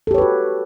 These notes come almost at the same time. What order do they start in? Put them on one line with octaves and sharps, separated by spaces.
A4 G4 C#5 B4 F#4